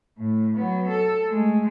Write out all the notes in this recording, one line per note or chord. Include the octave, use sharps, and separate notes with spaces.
A2
F#3 B3
A4
G#3 A3